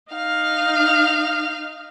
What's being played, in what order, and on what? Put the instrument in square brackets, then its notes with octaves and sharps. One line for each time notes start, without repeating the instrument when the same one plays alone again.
[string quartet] D#4 F5 F6